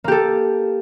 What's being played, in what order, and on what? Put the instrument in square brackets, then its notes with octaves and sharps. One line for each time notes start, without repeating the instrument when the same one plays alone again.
[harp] A#3
G4
A4